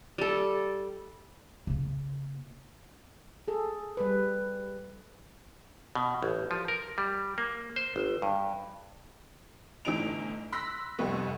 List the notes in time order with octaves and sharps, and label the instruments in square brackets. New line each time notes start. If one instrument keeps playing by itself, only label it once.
[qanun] G3 A4
[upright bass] C#3 A#3
[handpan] G#4 A4
G3 B4
[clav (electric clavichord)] B2
A1
F3
A#4
G3
A#3
C5
G1
G2
[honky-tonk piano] G1 A2 E3 D#4 D7 F7
B5 C6 E6 F#6 A#6 B6
F1 C2 F2 G3 B3 C#6